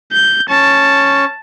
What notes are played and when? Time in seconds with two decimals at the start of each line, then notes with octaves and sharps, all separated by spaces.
0.12 G6
0.49 C#4 A5 C#6